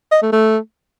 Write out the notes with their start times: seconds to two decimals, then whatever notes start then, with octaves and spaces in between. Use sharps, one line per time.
0.11 D#5
0.22 A3
0.33 A3